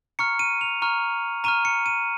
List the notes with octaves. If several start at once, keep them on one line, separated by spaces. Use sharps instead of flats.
A#5 C#6 F6 C#7
D#7
F7
A#5 C#6 F6
A#5 C#6 F6 D#7
C#7
D#7